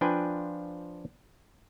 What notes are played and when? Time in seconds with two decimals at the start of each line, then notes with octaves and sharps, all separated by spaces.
0.01 F3 D4 F4 B4 G5 G#5